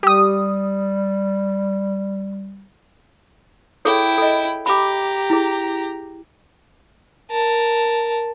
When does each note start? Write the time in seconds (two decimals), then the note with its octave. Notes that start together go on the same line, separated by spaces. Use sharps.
0.03 G3 G4 D#6
3.85 E4 G#4 A4 C#5 G5
4.18 A4 D#5
4.66 G4 A#5 B5 D6
5.30 E4 G#4
7.31 A#4 A5